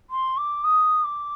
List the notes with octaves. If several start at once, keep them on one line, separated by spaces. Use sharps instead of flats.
C6
D6
D#6
D6